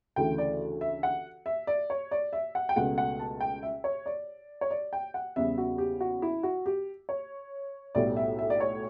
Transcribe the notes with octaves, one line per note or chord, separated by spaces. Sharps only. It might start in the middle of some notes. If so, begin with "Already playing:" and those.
D2 C#3 E3 A3 G5
D5
E5
F#5
E5
D5
C#5
D5
E5
F#5
G5
C#2 B2 A3 F#5
F#5
A5
G5
E5
C#5
D5
C#5
D5
G5
F#5
E2 C#3 G3 B3 E5
F#4
G4
F#4
E4
F#4
G4
C#5
B1 A2 G3 B3 D5
E5
E5
D5
C#5